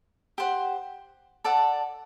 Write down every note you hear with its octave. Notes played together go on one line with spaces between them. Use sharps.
G4 C5 F#5
A4 D5 F#5 A5